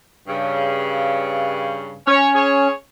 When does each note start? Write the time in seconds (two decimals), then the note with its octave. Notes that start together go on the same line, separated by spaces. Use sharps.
0.27 G2 C#3
2.07 C#4 C#5
2.35 G#4 C#5